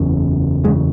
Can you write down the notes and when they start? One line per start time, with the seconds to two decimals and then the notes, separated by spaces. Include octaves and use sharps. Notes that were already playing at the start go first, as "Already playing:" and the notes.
Already playing: F#1 E2 C#3
0.64 F#1 E2 C#3 G#3